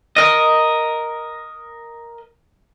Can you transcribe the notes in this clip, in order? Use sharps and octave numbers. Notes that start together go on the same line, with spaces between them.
A#4 D#5